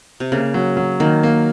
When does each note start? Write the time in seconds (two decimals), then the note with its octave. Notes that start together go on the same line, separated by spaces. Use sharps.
0.20 C3
0.32 C#3 A#3
0.54 F#3
0.77 F#3
1.00 D#3 A#3
1.23 A#3